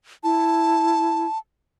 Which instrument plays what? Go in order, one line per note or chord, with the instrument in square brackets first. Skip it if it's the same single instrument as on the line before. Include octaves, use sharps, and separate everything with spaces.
[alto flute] E4 [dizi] A5